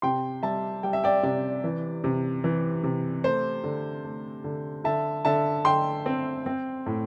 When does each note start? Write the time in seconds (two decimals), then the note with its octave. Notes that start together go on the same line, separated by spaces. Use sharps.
0.02 C3 G5 C6
0.43 G3 E5 A5
0.83 G3 G5
0.93 E5
1.04 D5 G5
1.23 C3 D5
1.64 E3
2.04 C3
2.44 E3
2.84 C3
3.24 A3 C5
3.64 D3
4.04 A3
4.44 D3
4.84 D3 E5 A5
5.25 D3 E5 A5
5.65 D3 G5 C6
6.06 C4
6.46 C4
6.86 A2